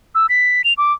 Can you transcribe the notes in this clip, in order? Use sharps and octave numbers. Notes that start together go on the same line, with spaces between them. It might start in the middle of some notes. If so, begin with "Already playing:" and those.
E6
B6
F7
D6